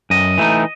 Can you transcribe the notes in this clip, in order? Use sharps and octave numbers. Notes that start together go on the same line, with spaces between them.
F#2 D#5
E3 A3 D#4